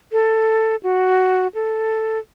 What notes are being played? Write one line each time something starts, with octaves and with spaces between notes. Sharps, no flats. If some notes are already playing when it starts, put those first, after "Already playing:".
A4
F#4
A4